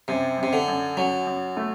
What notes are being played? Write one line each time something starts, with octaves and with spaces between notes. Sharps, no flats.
F#2 C3
F#2 C3
D3
F#2
F#2 F#3
F#2
A3